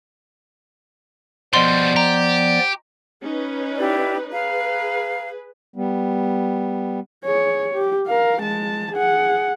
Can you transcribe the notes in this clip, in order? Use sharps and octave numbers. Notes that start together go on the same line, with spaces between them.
B2 F3 G3 B3 D5 D#5 C6
G4 A#5
C#4 D#4 B4
E4 G4 D5
G#4 B4 F5 A#5
G3 B3
G#4 C#5
G4
A#4 F5
G#3 A5
G#4 F#5